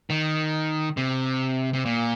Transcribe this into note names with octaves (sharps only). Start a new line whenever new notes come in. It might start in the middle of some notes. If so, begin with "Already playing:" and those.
D#3
C3
C3
A#2